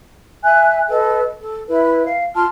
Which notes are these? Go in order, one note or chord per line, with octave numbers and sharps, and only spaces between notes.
E5 G#5 F#6
A4 B4 D#5
A4
E4 B4
F5
F4 A5 C6 F6